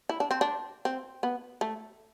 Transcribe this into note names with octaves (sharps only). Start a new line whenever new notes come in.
E4
D4
C4
D4
C4
B3
A3